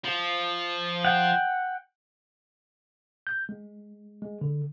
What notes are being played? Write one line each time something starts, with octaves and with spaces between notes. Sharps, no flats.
F3
F#5 G5
G6
G#3
G#3
D3